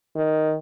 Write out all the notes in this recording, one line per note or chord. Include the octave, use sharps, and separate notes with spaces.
D#3